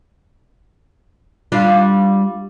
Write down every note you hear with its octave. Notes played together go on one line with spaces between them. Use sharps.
G3 D4 F4